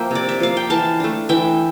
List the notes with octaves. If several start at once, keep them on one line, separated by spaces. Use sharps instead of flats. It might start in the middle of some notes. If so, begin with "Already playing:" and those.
Already playing: F3 A#3 E5 G5
C3 D5
E5
F3 A#3 F5
G5
E3 F5 A5
A3 D4
E3 E5 G5